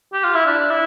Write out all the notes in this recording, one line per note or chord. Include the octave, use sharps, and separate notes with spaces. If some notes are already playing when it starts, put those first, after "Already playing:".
G4
F4
E4
D4
E4